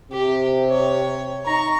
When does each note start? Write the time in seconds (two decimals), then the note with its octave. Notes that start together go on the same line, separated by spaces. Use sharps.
0.12 C3 G4
0.70 C#5
1.46 D#4 A#5 C#6